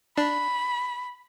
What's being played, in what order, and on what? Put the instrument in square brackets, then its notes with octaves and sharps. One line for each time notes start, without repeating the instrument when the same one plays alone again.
[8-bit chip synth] D4 [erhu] B5